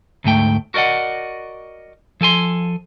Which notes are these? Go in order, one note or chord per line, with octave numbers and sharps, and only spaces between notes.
D2 G#2 A3 G5
F#4 A#4 D5 D#5 F#5
F3 A4 G#5 C6